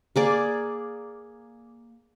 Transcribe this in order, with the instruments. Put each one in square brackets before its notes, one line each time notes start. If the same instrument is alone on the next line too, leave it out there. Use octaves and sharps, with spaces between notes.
[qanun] A#3 G#4 D5